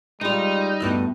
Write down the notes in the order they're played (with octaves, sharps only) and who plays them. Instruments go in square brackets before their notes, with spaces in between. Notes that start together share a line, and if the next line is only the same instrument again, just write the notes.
[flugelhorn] G3 [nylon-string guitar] G#3 F4 [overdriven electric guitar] D#4
[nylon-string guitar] D2 G2 A3 [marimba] B3 E4